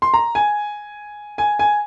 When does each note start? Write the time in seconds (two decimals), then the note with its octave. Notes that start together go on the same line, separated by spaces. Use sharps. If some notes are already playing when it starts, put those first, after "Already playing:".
0.02 C6
0.14 A#5
0.35 G#5
1.38 G#5
1.59 G#5